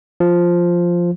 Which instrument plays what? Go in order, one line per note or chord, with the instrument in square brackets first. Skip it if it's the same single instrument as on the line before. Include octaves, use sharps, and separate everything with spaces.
[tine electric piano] F3